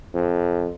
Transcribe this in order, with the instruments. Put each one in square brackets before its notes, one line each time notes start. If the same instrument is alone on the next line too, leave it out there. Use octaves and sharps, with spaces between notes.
[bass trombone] F2